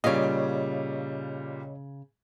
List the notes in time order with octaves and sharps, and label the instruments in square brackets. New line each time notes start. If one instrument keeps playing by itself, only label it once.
[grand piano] A#2 G3 [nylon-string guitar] C#3 F5 [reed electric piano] C#5 D#5